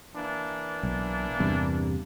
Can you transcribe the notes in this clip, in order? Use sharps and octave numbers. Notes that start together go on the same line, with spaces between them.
E3 A#3 D4
B1
E2 G2 C3